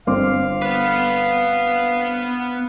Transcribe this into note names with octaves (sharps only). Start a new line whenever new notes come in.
G1 C4 F5 D6
B3 B4